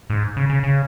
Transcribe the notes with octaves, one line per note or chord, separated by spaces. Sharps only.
G#2
C#3
C#3
C#3